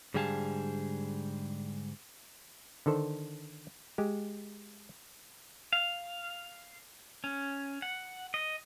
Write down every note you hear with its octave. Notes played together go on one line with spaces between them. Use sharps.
G#2 D3 G3 G#4 F5 A5
D3 D#3 A4 C5
G#3 G4
F5
C#4
F#5
D#5